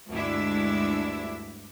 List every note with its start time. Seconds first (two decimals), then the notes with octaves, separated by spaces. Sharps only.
0.13 D2 G2 G#3 D4 E4 E5